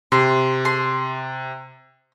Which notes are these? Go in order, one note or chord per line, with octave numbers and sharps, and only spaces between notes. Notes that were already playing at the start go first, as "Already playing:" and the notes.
C3 C6
C6